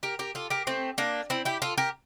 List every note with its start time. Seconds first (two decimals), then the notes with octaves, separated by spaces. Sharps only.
0.03 G4 A#4
0.19 G4 A#4
0.35 F4 A4
0.50 G4 A#4
0.67 A3 C4
0.98 A#3 D4
1.30 C4 E4
1.45 E4 G4
1.62 F4 A4
1.78 G4 A#4